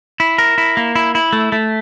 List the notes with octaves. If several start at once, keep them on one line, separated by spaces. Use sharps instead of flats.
E4
A#4
E4
A#3
E4
E4
A3
A3